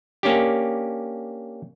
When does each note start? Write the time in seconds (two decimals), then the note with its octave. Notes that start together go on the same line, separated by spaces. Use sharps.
0.23 A#3 C#4 D4 G4